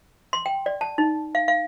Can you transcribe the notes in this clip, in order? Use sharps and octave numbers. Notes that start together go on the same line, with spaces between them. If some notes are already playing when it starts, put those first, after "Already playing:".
C6
G5
D5
A5
D#4
F5
F5